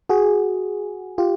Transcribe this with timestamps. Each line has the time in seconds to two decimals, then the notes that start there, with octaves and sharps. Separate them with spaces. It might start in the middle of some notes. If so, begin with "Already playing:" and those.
0.09 F#4 G#4
1.18 F4 G4